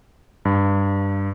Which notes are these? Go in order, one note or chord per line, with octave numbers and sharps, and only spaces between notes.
G2